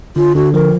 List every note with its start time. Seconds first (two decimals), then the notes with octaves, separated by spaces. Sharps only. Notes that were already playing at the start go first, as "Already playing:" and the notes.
0.16 D3 F4
0.35 D3 F#4
0.53 F3 A#4